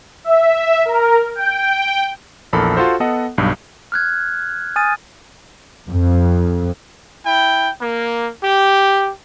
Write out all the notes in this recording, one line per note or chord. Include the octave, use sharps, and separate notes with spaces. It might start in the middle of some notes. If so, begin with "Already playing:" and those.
E5
A#4
G5
A#1 E2 A4 A#4 B5
F4 F#4 A4 C5
B3 A4 D#5 F#5
B1 G2
F6 F#6 G#6
G#5 D#6 F6 A6 D#7
F2
E4 G5
A#3
G4